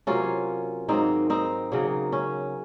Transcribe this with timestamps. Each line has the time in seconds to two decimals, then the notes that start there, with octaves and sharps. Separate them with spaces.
0.07 C3 F#3 A#3 C#4 F4
0.88 G#2 D#3 F#3 A#3 C4 D#4
1.30 C4 D#4
1.72 C#3 F#3 A#3
2.12 C#4